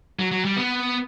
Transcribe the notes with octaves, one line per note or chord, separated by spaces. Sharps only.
F#3
F#3
G3
B3